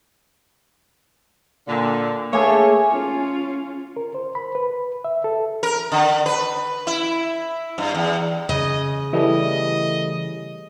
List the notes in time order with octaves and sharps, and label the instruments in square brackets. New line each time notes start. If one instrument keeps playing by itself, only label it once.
[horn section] A#2 D3
[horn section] A3 C#5 [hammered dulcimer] A#3 G#4
[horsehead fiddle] C#4 F4
[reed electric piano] A#4
C5
B5
B4
E5
A4
[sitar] A#4
D3
B4
E4
G2
E2
[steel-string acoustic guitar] C#3 [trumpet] D#5
[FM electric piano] E3 G3 A3 [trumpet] D#5